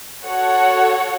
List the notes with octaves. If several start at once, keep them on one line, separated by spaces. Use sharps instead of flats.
F#4 A4 C#5 F#5